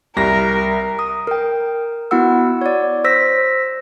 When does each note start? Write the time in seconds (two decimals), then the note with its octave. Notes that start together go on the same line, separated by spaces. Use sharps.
0.17 C2 A#4 A#6
0.99 D#6
1.27 A#4 G5
2.11 B3 E4 F#4 F#5 E6
2.61 C#5 D5
3.04 C5 E6 A#6 B6